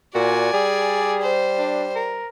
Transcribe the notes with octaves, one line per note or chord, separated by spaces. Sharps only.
A#2 F#4 D5 G#5
G3 G#4
C5
D4
A#4